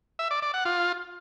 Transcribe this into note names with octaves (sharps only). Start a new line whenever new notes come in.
E5
D5
D5
F#5
F4